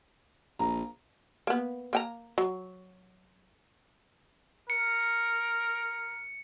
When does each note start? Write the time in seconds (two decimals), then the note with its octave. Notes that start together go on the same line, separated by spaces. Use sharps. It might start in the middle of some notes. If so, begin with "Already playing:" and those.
0.59 A#1 A#5
1.47 A#3 B3
1.93 A#3 G5 A#5
2.38 F#3
4.70 A#4 C#7